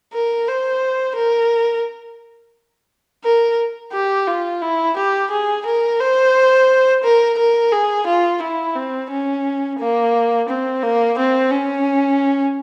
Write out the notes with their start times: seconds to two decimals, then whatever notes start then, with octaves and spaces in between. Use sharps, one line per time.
0.13 A#4
0.48 C5
1.16 A#4
3.24 A#4
3.93 G4
4.27 F4
4.62 E4
4.97 G4
5.31 G#4
5.66 A#4
6.00 C5
7.03 A#4
7.38 A#4
7.72 G#4
8.07 F4
8.42 E4
8.76 C4
9.11 C#4
9.79 A#3
10.49 C4
10.83 A#3
11.18 C4
11.52 C#4